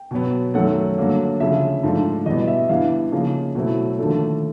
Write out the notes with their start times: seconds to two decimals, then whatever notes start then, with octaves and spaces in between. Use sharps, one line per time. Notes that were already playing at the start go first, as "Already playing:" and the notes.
Already playing: G5
0.11 B2 F#3 B3
0.54 F#2 D#3 F#3 A3 F#5
0.98 G2 D3 F#3 A#3
1.40 D2 C#3 F3 E5
1.83 G#2 F3 A3 D4
2.26 E2 B2 G3 B3 D#5
2.48 E5
2.69 G2 E3 G3 B3 F5
3.12 C#3 F3 A#3 D#4
3.55 B2 F#3 A3 C4 E4
3.98 D#2 D3 F3 A3 D4